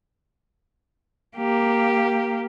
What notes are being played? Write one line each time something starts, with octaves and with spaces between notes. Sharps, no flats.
A#3 G4